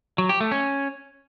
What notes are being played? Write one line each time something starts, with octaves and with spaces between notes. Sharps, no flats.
F#3
G4
A3
C#4